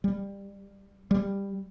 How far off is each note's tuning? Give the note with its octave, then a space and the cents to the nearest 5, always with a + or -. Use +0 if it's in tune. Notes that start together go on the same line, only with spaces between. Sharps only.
G3 +20
G3 +15